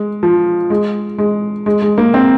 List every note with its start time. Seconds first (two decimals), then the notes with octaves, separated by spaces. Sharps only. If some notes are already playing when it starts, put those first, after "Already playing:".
Already playing: G#3
0.23 F3
0.70 G#3
1.18 G#3
1.66 G#3
1.82 G#3
1.98 A#3
2.14 C4